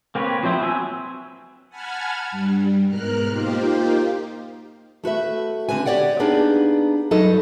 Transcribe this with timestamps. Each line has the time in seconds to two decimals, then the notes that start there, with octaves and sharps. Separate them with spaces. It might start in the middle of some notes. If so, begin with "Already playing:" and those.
0.15 A#3 C4 G4 B4 C#5
0.43 F3 F#3 C4 E4 C5
0.60 F#3 C4 G#5 E6
1.69 F#5 G#5 A5 B5 F6 G#6
2.31 G2 G3
2.88 G#2 B2 A#4 F6 F#6
3.30 A#3 D#4 F4 G4 C5
5.04 A3 F#4 B4 E5
5.69 D3 C4 B4 G#5
5.86 G4 C#5 D5 F#5 G5
6.20 A#3 B3 D4 D#4 G#4 B4
7.11 G2 F#3 D#4 A4 B4 D#5